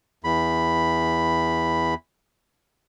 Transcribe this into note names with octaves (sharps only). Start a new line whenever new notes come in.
E2 B5